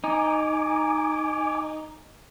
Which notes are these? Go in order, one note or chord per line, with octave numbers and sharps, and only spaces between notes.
D#4 G#5 D6